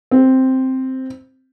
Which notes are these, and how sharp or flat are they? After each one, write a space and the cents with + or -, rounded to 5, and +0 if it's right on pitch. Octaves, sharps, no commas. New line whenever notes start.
C4 +0